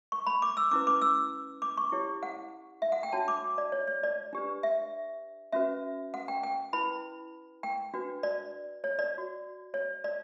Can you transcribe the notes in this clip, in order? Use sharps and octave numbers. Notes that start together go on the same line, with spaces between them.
C#6
B5
D6
E6
C#4 E4 B4 D6
D6
E6
D6
C#6
E4 G4 C#5
F#5
E5
F#5
G5
D4 F#4 C#5 A5
D6
D5
C#5
C#5
D5
D4 G4 B4
E5
C#4 F#4 B4 E5
F#5
G5
G5
E4 B4 B5
G5
D4 F#4 B4
D5
C#5
D5
F#4 C#5
C#5
D5